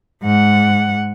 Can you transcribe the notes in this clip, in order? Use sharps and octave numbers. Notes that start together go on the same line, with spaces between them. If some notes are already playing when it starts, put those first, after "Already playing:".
G#2 F#5